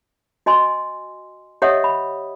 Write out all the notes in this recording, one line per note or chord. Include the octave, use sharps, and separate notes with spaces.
F#4 D#5 G#5 C6
G4 C#5 D#5 E5 F#5 D#6
B5